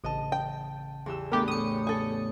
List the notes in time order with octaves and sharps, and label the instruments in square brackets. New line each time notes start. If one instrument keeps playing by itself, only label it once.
[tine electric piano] A1 C#3 A5 [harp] D#5 D#6
[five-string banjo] G5
[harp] E2 G4 E6
[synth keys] A3 G4 A#4 [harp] B3 D4
[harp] A2 [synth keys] D#6 C#7
[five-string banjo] G#4 A4